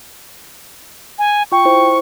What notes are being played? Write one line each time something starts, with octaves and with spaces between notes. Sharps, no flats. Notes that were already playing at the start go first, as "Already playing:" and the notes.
G#5
F4 G5 C#6
E4 C5